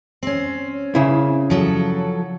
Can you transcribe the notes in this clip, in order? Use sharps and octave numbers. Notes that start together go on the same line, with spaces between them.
C4 C#4
C#3 E4
F3 F#3 A4